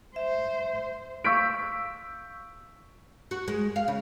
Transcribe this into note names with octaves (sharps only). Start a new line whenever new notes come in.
C5 E5
F5 C#6 E6 G6 B6 D7
F#4
G#3
F5
C#3